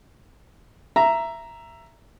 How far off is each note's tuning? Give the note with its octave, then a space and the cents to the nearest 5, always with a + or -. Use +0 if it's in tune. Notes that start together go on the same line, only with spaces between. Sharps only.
E5 +15 A#5 +0